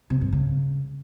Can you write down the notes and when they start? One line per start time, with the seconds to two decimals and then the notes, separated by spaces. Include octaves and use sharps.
0.10 C3
0.21 G2
0.32 C#3